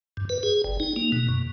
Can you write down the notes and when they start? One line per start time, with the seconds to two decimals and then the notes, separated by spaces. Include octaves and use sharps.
0.17 G2
0.29 B4
0.43 G#4
0.64 G1
0.80 D#4
0.96 A#3
1.12 B2
1.28 F#2